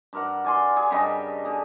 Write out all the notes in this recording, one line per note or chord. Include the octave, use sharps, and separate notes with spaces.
G2 A#4 F#5
D5 G#5 C6
G#4
G2 C#3 G3 D#5
D3 G#4